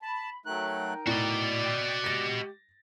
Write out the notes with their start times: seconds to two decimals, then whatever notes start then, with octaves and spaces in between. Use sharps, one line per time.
0.02 A5 B5
0.46 F#3 A3 D#4 A#4 G5 F#6
1.07 A2 F#4 D5 D#5
1.64 G5
2.04 G#3 G4 A6 A#6